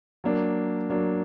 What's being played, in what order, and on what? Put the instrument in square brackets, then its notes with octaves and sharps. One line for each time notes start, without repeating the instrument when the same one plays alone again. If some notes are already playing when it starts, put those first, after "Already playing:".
[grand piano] F#3 A#3 D4
F#3 A#3 D4